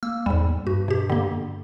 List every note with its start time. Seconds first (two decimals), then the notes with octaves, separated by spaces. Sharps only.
0.03 A#3 E6
0.26 E2 G#2 G3
0.67 G2 F#4
0.88 B2 G4
1.10 D3 A#3